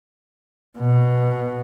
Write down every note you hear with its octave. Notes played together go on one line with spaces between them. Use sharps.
B2